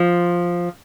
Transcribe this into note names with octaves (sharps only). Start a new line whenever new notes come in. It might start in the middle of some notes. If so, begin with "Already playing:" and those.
Already playing: F3